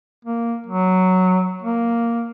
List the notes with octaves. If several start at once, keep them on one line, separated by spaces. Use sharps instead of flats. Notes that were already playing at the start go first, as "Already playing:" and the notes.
A#3
F#3
A#3